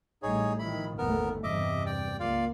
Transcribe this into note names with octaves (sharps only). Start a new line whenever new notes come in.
A1 A2 G3 D#4 G#4 C#5
D#3 F3 E4 B5
G1 D#2 A3 B3 A#4
E2 G2 C3 D#5 E5 D6
D5 G5
C#2 A#3 F4 D5 F5